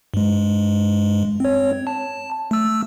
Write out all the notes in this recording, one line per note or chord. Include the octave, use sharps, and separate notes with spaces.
G2 G#3
C4 C#5
A5
A3 E6